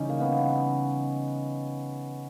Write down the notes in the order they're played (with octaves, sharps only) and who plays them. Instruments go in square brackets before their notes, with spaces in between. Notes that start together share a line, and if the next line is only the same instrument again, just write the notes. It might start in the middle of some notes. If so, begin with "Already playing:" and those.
Already playing: [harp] C#3 E3 G3 [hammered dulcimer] C#4 D#4
[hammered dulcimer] A#3
B3